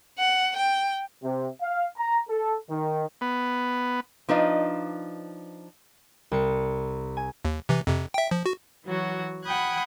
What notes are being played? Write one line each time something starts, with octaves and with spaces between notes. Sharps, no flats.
F#5
G5
C3
F5
A#5
A4
D#3
B3
F3 D4 D#4 B4 D#5 F5
C2 C#7
G#5
D#2
C3 E3
F2 C3
E5 G5
F3
F#4
E3 F#3 F#4
F#5 G5 B5 D#6 F#6 G#6